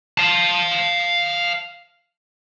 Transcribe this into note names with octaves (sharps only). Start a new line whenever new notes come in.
F5 A5